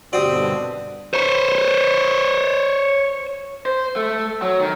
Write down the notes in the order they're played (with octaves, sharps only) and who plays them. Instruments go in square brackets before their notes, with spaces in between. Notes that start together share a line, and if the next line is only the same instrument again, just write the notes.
[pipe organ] G2 B2 D3 [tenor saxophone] C4 [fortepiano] F#4 G4 [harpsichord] D5 D#6
[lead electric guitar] C5 C#5
[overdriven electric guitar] C5
A3
F#3
D#3